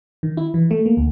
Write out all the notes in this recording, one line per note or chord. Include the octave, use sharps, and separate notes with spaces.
D#3
E4
E3
A3
A#3
D2